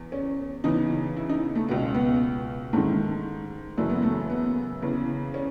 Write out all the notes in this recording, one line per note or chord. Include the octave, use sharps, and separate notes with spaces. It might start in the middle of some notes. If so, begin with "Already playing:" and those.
Already playing: E2
C#4
E2 C#3 E3 D#4
E4
D#4
A3
C#2 B2 B3
B3
G#2 D#3 A3
F#2 C#3 E3 A3
B3
A3
B3
E2 C#3 E3
C#4